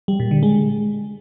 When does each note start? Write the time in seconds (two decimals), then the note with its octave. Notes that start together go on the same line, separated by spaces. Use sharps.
0.08 G3
0.20 A#2
0.31 D3
0.43 G#3